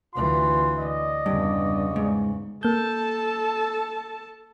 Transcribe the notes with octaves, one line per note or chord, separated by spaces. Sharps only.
D2 E3 F4 C6
D5 D#5
E2 G2 C#3
G#2
A#3 A4 A5 G6